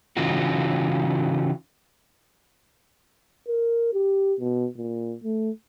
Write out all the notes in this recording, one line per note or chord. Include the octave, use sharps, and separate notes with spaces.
C#3 E3 D#4 F4 F#4
A#4
G4
B2
A#2
A3